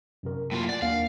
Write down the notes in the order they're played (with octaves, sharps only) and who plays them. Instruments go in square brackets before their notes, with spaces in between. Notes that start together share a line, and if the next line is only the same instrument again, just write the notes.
[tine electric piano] F#2 C3 A#4
[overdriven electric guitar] A2 F4 [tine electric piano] F#3 A#3
[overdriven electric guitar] D5 [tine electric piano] F#5 G#5
[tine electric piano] D#2 A#3 D4 [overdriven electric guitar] F5